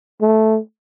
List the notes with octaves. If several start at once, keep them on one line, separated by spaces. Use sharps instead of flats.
A3